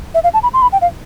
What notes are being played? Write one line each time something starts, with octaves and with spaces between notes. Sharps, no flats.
E5
F5
A5
B5
C6
B5
G5
F5